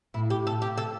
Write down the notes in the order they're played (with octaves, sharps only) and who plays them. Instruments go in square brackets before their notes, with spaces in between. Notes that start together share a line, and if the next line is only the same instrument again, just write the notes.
[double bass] A2 [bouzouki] E4
[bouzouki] G4
[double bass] A2 [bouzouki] A4
[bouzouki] G4
A4